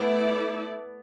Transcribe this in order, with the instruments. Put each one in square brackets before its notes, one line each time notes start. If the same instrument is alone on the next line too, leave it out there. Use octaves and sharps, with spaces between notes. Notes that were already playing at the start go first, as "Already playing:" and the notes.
Already playing: [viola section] A3 E4 A4 D5 [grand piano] B3